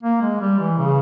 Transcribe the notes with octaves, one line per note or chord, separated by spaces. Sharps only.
A#3
G#3
G3
E3
C#3